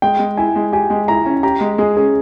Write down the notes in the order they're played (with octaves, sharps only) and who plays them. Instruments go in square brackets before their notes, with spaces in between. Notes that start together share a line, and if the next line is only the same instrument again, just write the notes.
[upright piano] G#3 [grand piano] G5
[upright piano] G#3
[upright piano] E4 [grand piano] G#5
[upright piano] G#3
[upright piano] G4 [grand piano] G#5
[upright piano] G#3
[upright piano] E4 [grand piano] A#5
[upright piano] C#4
[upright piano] G4 [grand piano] A#5
[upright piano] G#3
[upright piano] G#3 [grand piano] G#4
[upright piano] C#4 [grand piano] G#4